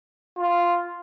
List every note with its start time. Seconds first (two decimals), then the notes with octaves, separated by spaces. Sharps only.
0.38 F4